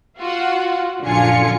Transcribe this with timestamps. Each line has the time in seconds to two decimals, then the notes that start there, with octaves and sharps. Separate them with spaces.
0.17 F4 F#4 F#5
1.02 A#1 F#2 D3 F4 G#5 C#7